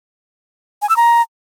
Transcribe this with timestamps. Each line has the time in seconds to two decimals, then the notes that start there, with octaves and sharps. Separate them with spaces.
0.82 G#5
0.89 E6
0.97 A#5